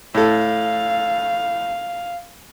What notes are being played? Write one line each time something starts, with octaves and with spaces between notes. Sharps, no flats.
A2 A4 F5